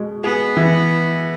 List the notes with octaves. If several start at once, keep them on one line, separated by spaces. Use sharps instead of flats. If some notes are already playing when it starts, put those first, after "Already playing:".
Already playing: B2 G#3
B3 G#4
E3